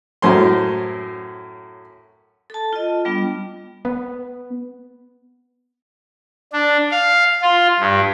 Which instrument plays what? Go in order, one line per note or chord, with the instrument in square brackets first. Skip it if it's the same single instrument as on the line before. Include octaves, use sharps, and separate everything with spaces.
[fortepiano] F#2 A2 C5 C6
[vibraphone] A4 A5
F4 D#5
G3 B3 D4 F4
[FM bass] B3
[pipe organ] D4
F5
F4
G2